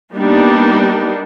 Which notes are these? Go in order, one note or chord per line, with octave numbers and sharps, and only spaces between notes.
G3 A#3 B3 D4 D#4